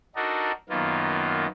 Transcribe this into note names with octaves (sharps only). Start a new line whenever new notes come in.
D4 D#4 F#4 A4 A#4
F#2 D#3 A#3 B3 F4